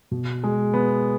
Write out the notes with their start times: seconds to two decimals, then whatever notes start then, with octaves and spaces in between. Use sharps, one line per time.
0.11 B2
0.44 G#3
0.74 B3